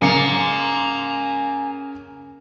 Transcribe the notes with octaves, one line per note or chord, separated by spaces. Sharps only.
C#3 A#3 G#5 A#5 C#7